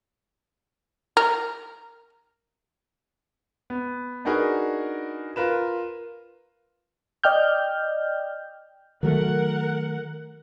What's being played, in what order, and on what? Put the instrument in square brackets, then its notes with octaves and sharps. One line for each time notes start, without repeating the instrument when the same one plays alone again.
[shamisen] A#4
[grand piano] B3
D4 D#4 F#4 G#4 A#4 B4
F4 A#4 B4 E7
[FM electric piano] D5 D#5 G5 F6 G6
[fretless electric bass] D#3 F#3 A3 [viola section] A#4 F#5